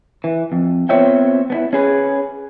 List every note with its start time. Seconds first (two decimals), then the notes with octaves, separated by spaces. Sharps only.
0.24 E3
0.52 F2
0.89 B3 C4 F4 C#5 E5 G5
1.50 B3 C#4 E4
1.73 C#4 G#4 B4